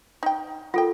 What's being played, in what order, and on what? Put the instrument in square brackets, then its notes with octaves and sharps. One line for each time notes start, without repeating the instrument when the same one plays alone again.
[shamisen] D#4 G5
[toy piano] F4 A4 A#4 [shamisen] F#5 G5